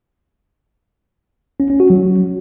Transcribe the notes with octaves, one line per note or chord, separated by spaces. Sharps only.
C#4
C#4
F#4
F#3